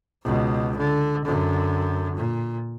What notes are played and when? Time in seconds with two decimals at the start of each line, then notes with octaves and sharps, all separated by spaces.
0.23 C#2 B2
0.77 D3
1.25 F#2 D3
2.16 A#2